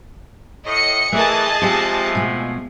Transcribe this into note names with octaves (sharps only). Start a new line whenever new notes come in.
A2 D#5 C#7
E3 A3 G#4 A#4 D#5 A5
C3 E3 F3 G#3 C4 G4
B2 G#3 A3